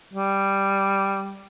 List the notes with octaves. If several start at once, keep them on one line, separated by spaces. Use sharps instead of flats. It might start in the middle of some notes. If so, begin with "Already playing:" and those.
G3